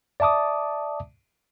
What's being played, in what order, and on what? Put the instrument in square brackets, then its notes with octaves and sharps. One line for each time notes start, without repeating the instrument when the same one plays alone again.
[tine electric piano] D5 E5 A5 D6 D#6